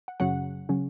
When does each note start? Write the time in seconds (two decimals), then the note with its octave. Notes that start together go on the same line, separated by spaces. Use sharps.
0.08 F#5
0.20 F#2 C#3 F#3 C#4 F#5
0.69 C#3 F#3 C#4